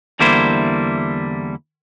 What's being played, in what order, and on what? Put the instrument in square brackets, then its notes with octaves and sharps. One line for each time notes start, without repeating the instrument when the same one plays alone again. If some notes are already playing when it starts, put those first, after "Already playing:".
[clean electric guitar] E2 D3 G3 A#3 E4 C5